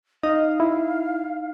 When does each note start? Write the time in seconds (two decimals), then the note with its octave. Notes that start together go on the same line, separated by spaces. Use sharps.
0.23 D#4 D#5 F5
0.60 E4